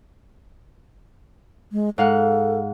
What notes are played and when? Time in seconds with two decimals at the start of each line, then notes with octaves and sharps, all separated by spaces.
1.72 G#3
1.98 G#2 A4 F5 F#5